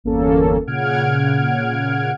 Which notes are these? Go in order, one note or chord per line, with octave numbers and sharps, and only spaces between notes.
G1 E2 A#3 C#4 A4
A#2 C#3 F#5 F6 G#6 D7